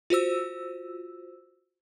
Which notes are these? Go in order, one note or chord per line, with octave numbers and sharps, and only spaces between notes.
F4 F#4 C5 E6